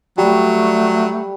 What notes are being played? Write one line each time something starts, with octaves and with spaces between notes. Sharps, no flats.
F#3 G3 A3